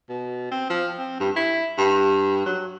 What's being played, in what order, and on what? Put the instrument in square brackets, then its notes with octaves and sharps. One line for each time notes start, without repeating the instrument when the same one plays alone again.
[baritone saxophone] B2
C4
F3
C4
G2
E4
G2
F#3